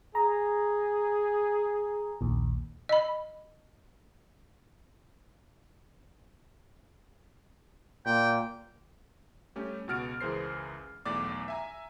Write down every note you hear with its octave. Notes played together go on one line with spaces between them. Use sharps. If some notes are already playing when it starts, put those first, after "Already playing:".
G#4 A#5
A#1 D#2
D#5 B5
A#2 G5
G3 A3 C#4 G4
C#2 B2 F#4 F6 A6 D7
C#2 E3 G#4 A#4 C5 C7
B1 E2 A3 D5 D6
E5 G#5 A#5